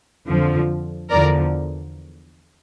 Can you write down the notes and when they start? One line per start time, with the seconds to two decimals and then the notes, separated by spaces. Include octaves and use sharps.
0.27 F2 D3 F3
1.10 E2 D3 F3 A#4 D5